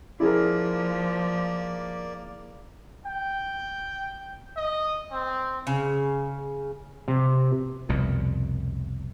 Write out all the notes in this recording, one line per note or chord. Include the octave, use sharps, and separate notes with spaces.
F3 A#3 E4 G#4 A#4 D5
G5
D#5
C4
C#3
C3
C2 F2 B2